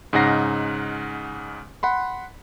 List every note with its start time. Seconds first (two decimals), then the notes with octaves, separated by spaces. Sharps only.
0.13 G#2 C#3 D#4 F#5 A#6 C7
1.83 F#5 B5 C6